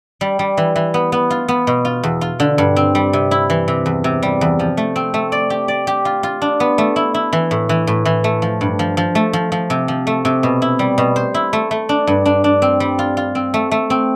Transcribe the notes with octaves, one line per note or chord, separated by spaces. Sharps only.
G3
G3
E3
E3
B3
B3
F4
B3
B2
F4
E2
F4
D3
G2
C4
G3
C3
E4
E3
C3
E2
C3
G3
E2
F3
A3
C4
A3
D5
G4
D5
G4
F4
F4
D4
B3
A3
E4
E4
E3
A2
E3
A2
E3
A3
F3
G2
F3
F3
A3
F3
F3
C3
F3
A3
C3
B2
E4
G3
B2
C5
E4
A3
A3
D4
G2
D4
D4
C4
G3
F4
F4
C4
A3
A3
C4